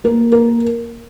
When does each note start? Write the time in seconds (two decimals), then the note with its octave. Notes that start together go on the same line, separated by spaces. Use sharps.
0.04 A#3 A#4
0.32 A#4